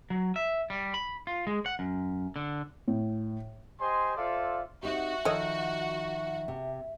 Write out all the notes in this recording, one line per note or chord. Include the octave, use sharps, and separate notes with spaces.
F#3
E5
G3
B5
F4
G#3
F#5
F#2
D3
A2
G4 C5 D#5 G#5 C6
F4 A4 C5 D5 E5 F5
C4 D#4 F#4 G4 E5
D#3 F3 A4 C#5 D#5
C3